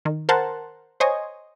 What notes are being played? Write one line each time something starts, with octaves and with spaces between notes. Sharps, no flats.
D#3
A#4 C5 F#5 A5
C5 C#5 D#5 G#5